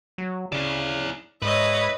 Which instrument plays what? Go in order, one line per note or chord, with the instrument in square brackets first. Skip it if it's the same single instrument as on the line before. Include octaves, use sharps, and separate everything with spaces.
[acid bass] F#3
[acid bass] C#3 [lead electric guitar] E4 D5
[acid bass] G#2 [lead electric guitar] B4 [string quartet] C#5 D#5 E5